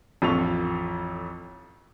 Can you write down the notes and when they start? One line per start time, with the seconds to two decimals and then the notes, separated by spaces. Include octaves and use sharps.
0.22 A1 F2 F4 A4 C#6 F7